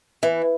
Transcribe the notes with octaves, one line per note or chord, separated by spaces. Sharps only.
E3